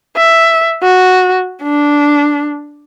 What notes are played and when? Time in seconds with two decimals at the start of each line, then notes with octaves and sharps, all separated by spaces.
0.17 E5
0.82 F#4
1.63 D4